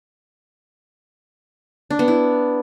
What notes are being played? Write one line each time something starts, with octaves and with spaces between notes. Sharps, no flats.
D4
B3
E4